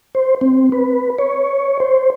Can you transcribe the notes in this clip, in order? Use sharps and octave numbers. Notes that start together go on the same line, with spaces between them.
C5
C4
B4
C#5
C5